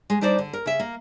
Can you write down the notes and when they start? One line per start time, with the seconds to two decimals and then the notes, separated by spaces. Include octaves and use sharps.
0.10 G#3
0.21 G3 D4 D#4 C5 D5
0.38 D3
0.53 A#4
0.66 C#3 E5
0.79 A#3